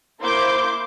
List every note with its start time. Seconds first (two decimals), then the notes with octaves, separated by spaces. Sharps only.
0.21 A#3 E4 C5 C6 D6 G6